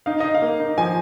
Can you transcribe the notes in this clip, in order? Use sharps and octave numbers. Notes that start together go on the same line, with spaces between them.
D#4 F5
D#4 D#5
F5
A#3
D#4
F3 G#5